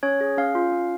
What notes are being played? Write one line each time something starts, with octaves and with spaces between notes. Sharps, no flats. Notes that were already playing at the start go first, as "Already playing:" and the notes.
C#4 C#5
G#4
C#4 F5
F4
C#4